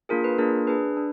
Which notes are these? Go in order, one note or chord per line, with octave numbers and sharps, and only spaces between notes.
A#3 D4 F4 G#4 A#4
B4
A#3 D4 F4 G#4 A#4
D4 G#4 B4
D4